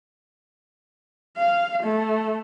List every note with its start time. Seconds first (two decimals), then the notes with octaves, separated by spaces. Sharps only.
1.37 F5
1.83 A3